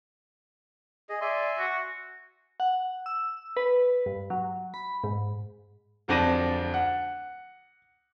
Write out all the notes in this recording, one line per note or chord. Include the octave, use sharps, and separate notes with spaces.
G#4 D#5
D5 E5 G#5 C6
F#4
F#5
E6
B4
G2
F#3
B5
G#2
D1 F2 F3 D4 A#6 D#7
F#5